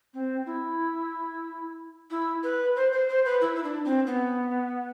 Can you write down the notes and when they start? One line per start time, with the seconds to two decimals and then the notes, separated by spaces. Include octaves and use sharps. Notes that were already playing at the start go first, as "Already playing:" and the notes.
0.14 C4
0.46 E4
2.11 E4
2.44 B4
2.76 C5
2.92 C5
3.09 C5
3.25 B4
3.41 E4
3.55 E4
3.64 D4
3.85 C4
4.07 B3